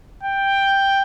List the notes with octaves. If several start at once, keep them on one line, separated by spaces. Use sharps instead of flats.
G5